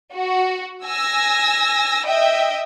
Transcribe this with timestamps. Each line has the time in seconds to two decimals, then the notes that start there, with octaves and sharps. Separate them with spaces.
0.13 F#4
0.85 G#5 E6 A#6
2.04 D#5 E5 G5